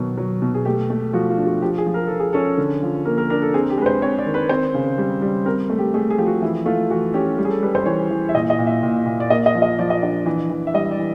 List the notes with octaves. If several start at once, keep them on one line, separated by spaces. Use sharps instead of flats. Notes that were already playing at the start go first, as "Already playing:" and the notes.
Already playing: B2 D#3 F#3
F#3
B2
G#4
A3 G4
A3
F3 F#4
F4
D4
F#4
F3 G4
G#4
F3
A#4
F3 A4
G#4
C#4 A4
D3
F3
A#3 A#4
A#4
D4 A#4
A4
C4 G#4
G4
G#3 B4
C5
C4 C#5
D5
D#3
B4
C4 C5
C#3
G3
G3
C4 A#4
A3
G4
A3 G#4
G#4
F3 G4
F#4
E3 E4
A3 F4
E3 F#4
C#4 G4
G3
G#4
A4
G3 B4
C5
E3 C#5
E3
E5
A#2 D#5
D#5
A#2
E5
A#2
A#2
D5
A#3 D#5
D#5
F3
D#5
F3 D5
D#5
D4 D#5
E3
E3
E5
G3 D#5
D5
E3